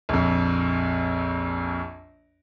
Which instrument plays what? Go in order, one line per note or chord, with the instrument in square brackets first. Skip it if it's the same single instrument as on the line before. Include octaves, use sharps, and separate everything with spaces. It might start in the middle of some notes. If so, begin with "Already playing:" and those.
[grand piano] A#1 F2